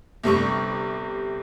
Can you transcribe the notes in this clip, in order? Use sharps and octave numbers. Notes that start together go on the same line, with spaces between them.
G1 C3 G3 C#6